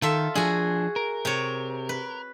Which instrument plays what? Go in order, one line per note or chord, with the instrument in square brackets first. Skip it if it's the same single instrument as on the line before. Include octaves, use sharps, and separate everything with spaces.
[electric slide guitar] D#3 [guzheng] F4 A4 E5
[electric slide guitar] F3 D4 [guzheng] F#4 G#4
[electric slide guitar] A#4
[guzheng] C3 C#5
B4